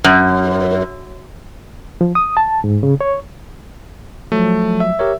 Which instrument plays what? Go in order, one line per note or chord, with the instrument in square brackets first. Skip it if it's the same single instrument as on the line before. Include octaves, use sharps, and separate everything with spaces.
[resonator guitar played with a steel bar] F#2
[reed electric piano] F3
D#6
A5
G#2
C#3
C#5
[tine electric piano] F3 F#3 [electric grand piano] A3
[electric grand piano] E5
[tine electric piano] G4 A#4 C#5